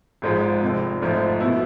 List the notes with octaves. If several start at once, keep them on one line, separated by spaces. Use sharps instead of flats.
G#1 G#2 F3 G#3
F1 F2 C3
G#1 G#2 F3 A3
B2 B3 E4